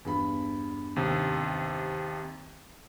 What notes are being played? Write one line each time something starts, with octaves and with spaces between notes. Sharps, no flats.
E2 G2 B5
D#2 C3